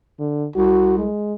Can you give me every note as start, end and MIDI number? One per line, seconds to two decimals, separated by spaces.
0.19 0.47 50
0.56 1.07 36
0.56 0.94 66
0.98 1.34 56